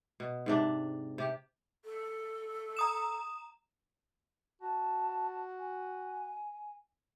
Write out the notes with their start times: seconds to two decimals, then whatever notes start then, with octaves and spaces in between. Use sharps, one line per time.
0.20 B2
0.46 G#2 C3 D4
1.18 C3 G4
1.85 A4
2.77 A#5 D#6 E7
4.61 F#4 A5
5.59 G#5